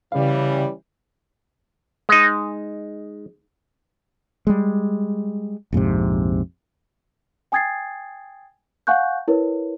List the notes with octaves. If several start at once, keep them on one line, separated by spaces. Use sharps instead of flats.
C#3 E3 G3 C#4 F5
G#3 D#4
G3 G#3
A#1 F2 G#2 C3
G5 G#5 D#6 G#6 A6 C7
F5 F#5 G#5 C#6 F#6 G6
E4 A#4 B4 C#5